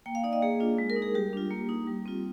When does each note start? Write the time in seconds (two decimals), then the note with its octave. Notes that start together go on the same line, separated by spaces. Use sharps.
0.06 A#3 G5
0.15 F5
0.24 D#4 D5
0.33 D#5
0.42 A#3 G#4
0.60 D4 F4
0.78 G#3
0.90 A#4
0.96 D#4
1.02 G#4
1.15 G3 G4
1.33 D4 F4
1.51 A#3
1.69 D#4
1.87 G3
2.06 C4 F4